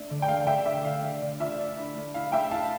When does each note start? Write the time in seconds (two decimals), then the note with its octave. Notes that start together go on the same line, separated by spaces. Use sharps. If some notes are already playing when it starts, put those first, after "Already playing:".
Already playing: A3 D4
0.10 D3
0.22 G5
0.28 A3 F5
0.46 D3 E5 G5
0.65 D4 E5
0.84 D3 F5
1.03 A3
1.22 D3
1.39 F4 E5
1.59 D4
1.77 E4
1.95 A3
2.14 E4 F5
2.32 A3 E5 G5
2.51 E4 F5 A5